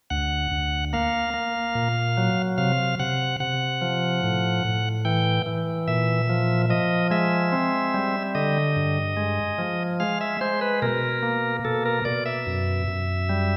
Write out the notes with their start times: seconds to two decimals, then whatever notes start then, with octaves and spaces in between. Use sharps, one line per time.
0.10 D2 F#5
0.52 D2
0.93 A#3 F5
1.34 A#3
1.75 A#2
2.17 F#3
2.58 C3 F5
2.99 C3 F#5
3.40 C3 F#5
3.82 F3
4.23 A2
4.65 A2
5.05 E3 G5
5.46 E3
5.88 A#2 E5
6.29 F3
6.69 F3 D#5
7.11 G#3 E5
7.52 C4
7.94 G3
8.35 D3 D#5
8.76 G2
9.17 G#3
9.58 F3
10.00 G#3 F5
10.21 E5
10.41 G#3 C5
10.61 B4
10.82 B2 A#4
11.23 A#3
11.65 B2 A4
11.86 A#4
12.05 B2 D5
12.26 E5
12.47 F#2
12.88 F#2
13.29 G3